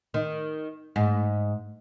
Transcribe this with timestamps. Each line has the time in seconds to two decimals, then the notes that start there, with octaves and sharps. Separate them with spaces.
0.14 D#3
0.96 G#2